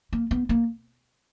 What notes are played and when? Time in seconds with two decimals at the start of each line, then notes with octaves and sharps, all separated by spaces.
0.13 A#3
0.31 B3
0.49 A#3